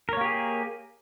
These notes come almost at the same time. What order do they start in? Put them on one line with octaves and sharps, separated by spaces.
A#4 C#5 A#3 G4 G#4